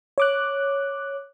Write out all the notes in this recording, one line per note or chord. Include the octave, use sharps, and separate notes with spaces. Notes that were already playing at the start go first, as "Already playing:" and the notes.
C#5 D6 F#6